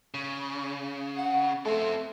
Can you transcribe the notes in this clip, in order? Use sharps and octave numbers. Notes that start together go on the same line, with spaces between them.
C#3
F#5
A3 C4 A4